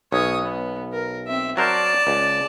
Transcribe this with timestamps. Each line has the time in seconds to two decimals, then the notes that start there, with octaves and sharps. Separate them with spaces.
0.12 B1 C#5 D#6
0.42 B3
0.92 A#4
1.27 C4 E5
1.57 F#3 A#4 C5 D5 A5
2.07 C#2